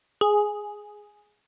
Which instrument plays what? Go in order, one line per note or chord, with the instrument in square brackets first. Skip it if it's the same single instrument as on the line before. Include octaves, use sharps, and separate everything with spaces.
[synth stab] G#4